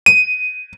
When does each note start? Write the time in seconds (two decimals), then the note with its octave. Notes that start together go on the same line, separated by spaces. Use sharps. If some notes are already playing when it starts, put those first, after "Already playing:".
0.06 D#7